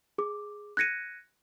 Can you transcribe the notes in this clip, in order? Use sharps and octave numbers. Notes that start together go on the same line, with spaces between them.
G#4 D6
F#6 G#6 A#6 C#7 D#7